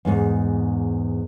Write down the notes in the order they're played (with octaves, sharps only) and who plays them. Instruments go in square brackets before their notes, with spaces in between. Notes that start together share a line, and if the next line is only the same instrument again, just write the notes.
[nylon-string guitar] E2 G#2